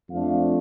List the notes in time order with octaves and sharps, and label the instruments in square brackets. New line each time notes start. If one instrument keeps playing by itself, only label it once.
[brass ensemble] F2 F3 A3 D4 F5